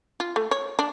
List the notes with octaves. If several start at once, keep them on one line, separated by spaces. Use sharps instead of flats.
F4
A3
C#5
D4